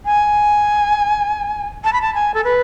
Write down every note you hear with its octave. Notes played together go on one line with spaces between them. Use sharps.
G#5
A5
B5
A5
G#5
A4
B4